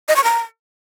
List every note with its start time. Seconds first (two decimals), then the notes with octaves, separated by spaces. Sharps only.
0.09 D#5
0.16 C#6
0.24 A#5